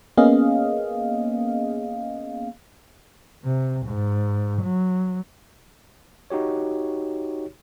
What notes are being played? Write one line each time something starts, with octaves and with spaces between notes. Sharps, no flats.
A#3 B3 C#4 G#4 D#5 F5
C3
G#2
F#3
D#4 F#4 G4 C#5